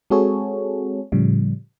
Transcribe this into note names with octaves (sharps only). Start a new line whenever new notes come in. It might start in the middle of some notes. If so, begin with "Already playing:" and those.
G#3 C4 F#4 G#4 A4 C#5
A2 C#3 F3 G3